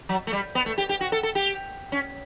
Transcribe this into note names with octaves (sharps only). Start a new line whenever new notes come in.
F#3
A3
G3
B3
A3
G4
G4
F#4
A4
A4
G4
C#4